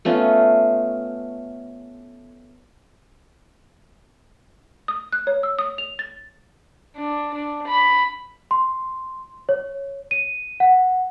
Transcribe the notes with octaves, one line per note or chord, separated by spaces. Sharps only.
A3 B3 C#4 F4
D#6
F#6
C#5
E6
D#6
F7
A6
D4
D4
B5
C6
C#5
D#7
F#5